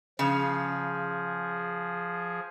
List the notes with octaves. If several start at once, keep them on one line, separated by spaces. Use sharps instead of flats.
C#3 F3 G#4